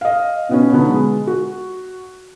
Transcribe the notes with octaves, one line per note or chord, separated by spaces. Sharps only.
D#5 F5
B2 B3 C#4
B2 D3 B3 D#4
G#3
F#4